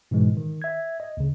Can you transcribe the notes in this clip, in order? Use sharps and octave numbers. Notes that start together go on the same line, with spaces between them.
G#2 B2 E3 G#3
D#3
E5 G#6
D#5
D2 C#3